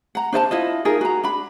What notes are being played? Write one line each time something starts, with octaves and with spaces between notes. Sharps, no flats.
F#5 A#5
D4 C5 D#5 A5
E4 F4 D#5
D#4 F4 G#4 A#4
F#4 A#5
D4 B5